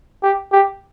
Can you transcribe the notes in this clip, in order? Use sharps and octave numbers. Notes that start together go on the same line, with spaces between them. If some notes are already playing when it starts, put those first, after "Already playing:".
G4
G4